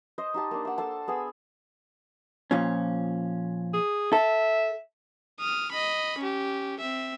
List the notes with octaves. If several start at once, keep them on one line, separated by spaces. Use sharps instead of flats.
C5 D#5
D#4 G4 A5
A#3 D4
F#5 E6
A4 C5 A5
B3 G#4 G#5 E6
A#2 F3 C#4
G#4
A4 E5
D#6 F6
D#5 B5
C#4 G4
C4 E5